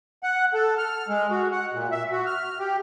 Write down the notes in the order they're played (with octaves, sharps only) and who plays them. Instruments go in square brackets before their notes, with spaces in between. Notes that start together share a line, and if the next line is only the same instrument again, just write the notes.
[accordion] F#5
A4
F6
G#3
F#4
F#5
A#2
E5
F#4
F6
G4